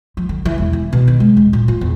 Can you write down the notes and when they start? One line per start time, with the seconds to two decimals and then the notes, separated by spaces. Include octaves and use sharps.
0.17 F3
0.29 D3
0.45 E3
0.58 E1
0.73 E3
0.93 B2
1.08 D#3
1.20 G#3
1.37 D#1
1.53 A#2
1.68 F4
1.81 E2